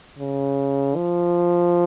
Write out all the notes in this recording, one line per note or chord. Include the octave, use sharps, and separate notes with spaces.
C#3
F3